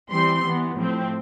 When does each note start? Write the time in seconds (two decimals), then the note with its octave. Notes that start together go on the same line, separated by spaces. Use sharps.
0.11 E3 G3 C4 C6
0.44 E3 B3
0.77 A2 F3 C4